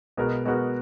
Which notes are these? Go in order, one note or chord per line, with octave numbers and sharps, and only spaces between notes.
B2 G#3 B3 F#4 A#4
B2 G#3 B3 F#4 A#4